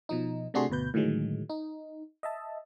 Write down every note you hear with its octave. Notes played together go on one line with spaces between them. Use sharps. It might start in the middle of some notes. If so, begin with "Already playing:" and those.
B2 F3 D#4
C3 A3 D4 F#4 G#4 C6
G1 D2 B2 B4 G6
A2 D3 D#3 F#3 G#3
D#4
D#5 E5 A5